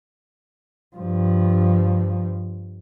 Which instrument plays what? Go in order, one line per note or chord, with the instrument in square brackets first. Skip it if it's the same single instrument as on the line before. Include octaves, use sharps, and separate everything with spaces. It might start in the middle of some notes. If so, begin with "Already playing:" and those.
[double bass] G2 F3